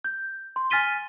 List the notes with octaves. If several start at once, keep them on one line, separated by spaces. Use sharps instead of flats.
G6
C6
G#5 F6 A6 B6 D#7 G7